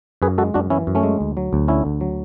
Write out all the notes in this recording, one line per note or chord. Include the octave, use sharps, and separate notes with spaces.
F#2 G#4 B4
G#3 F#4 A4
F#2 D4 F#4
E3 C#4 E4
F#2
A3 C#4
G#3
D2
F#3
D2
D3 C#4 E4
D2
F#3